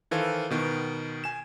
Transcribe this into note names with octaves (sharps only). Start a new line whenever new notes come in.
D#3 E3 A4 C5 F5
B2 D#3 B3
G#5 E7